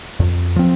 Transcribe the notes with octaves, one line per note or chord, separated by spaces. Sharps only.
F2
F3 C4